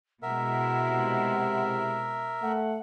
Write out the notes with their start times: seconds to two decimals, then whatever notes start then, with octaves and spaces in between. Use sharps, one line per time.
0.22 B2 G#3 E4 A#4 E5 F#5
0.90 C3
2.42 A3 F#5